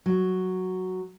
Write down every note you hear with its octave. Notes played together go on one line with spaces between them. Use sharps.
F#3